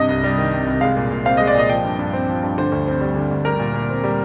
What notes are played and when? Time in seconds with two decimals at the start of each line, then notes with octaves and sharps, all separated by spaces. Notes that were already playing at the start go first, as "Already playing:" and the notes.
Already playing: G2 C3 D#5
0.09 C2
0.24 G3
0.38 D#3
0.53 C3
0.67 C2
0.81 G#3 F5
0.97 A#2
1.11 A#2
1.25 C4 F5
1.37 G#3 D#5
1.47 D5
1.55 A#2 D#5
1.69 F3 G5
1.85 G2
1.99 G2
2.13 C4
2.29 F3
2.43 G2
2.58 D3 C5
2.72 D2
2.87 C4
3.01 G3
3.16 D3
3.31 D2
3.45 G3 A#4
3.59 A#2
3.74 A#2
3.90 C4
4.04 G3